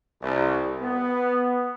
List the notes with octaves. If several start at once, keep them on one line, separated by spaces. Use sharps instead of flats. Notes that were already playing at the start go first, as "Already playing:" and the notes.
C2
B3